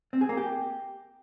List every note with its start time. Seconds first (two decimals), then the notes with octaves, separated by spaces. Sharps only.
0.13 C4
0.21 G#4
0.29 A#3
0.37 G4